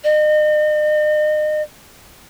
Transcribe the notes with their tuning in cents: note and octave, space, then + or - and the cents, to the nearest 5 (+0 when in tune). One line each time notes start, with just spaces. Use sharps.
D#5 -40